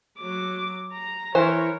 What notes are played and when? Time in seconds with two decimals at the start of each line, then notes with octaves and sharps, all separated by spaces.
0.19 F#3 D6
0.93 A#5
1.35 E3 A#4 C5 C#5